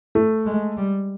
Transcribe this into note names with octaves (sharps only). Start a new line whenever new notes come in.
A3
G#3
G3